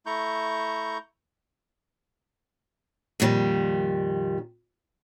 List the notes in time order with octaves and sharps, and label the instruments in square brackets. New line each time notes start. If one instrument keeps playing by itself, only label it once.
[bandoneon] A3 E4 A#5 C#6 G6
[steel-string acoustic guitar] F2 A#2 D#3 G3